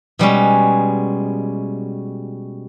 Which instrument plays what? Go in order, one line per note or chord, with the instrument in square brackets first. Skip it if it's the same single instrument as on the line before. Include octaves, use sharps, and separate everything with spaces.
[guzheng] B2 G3 G#3 C#4